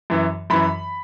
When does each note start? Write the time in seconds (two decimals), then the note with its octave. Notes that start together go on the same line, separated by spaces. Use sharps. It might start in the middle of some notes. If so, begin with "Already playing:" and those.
0.10 F#2 E3
0.50 F#2 E3 B5